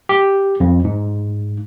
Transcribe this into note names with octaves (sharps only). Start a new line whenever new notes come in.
G4
F2
G#2